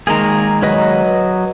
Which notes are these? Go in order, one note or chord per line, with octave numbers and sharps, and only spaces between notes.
D#3 G#3 A#3 G#4 A#5
F#3 B4 D#5